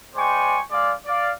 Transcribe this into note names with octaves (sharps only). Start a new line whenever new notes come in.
G#3 C5 D5 G5 G#5 C#6
G#3 D5 F5
D5 F5